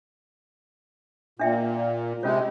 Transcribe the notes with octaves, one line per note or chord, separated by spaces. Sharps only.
A#2 D4 E5 G5
C3 G#3 C#4 F4 C#5